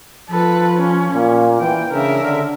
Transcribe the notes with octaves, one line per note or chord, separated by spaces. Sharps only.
F3 A4 B4
C#4
A#2 A#3
E3 G5
C#3 D4 A#4 E5
D3